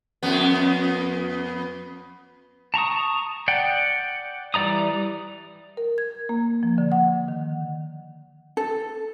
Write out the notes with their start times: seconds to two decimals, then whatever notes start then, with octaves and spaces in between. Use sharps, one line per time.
0.23 F2 B3
2.74 A5 A#5 C#6 D#6
3.48 D5 F#5 G5
4.54 E3 G3 D5 A#5 D#6
5.77 A#4
5.98 G#6
6.29 A#3
6.63 F3
6.78 D3
6.92 F#5
7.28 D#3
8.57 A4